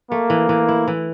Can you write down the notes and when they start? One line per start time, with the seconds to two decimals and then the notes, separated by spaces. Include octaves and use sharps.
0.11 A3 A#3
0.30 E3
0.49 E3
0.68 E4
0.88 E3